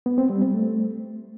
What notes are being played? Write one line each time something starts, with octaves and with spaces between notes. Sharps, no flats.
B3
C4
G3
C4
A3